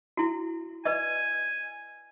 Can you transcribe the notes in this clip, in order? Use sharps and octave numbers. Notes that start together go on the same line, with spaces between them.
E4 F#4
B4 D5 D#5 G#5